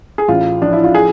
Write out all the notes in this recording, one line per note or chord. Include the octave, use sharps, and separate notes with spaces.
G#4
A1 F4
F3 D4
E4
F4
G#4